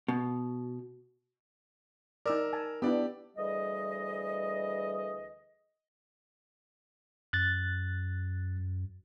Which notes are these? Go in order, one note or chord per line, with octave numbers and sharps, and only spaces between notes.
B2
D#4 A#4 D5 E6
G#5 A5
B3 D4 E4 G4 D5
D2 E3 G3 G#4 D#5
F#2 F#6 A6